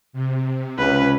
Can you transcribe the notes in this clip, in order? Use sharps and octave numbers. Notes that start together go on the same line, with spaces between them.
C3
C#2 C#4 B4